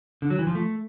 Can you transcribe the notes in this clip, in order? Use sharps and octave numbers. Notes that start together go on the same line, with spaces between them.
D3
F#3
E3
F3
A3